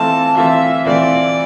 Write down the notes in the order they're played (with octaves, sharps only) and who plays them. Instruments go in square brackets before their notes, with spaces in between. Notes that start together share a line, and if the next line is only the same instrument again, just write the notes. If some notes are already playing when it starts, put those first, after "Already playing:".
Already playing: [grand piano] E3 A3 C4 F4 [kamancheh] A5
[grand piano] E3 A3 C4 F4 [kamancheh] E5
[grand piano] E3 A3 C4 F4 [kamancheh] D5